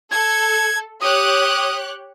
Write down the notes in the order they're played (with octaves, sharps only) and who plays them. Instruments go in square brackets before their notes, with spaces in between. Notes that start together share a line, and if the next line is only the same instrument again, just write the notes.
[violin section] A4 [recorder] G#6
[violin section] G4 C#5 F#6 [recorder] D#6